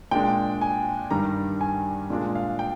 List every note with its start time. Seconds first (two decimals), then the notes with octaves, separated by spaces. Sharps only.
0.11 A#2 G#3 D4 G5
0.61 G#5
1.11 G2 D#3 G3 D4 A#5
1.61 G#5
2.10 A#2 G#3 D4 F4
2.35 F5
2.59 G5